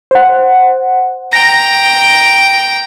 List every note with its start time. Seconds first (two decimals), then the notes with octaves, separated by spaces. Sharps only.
0.11 C5 F#5
1.33 G5 A#5 A#6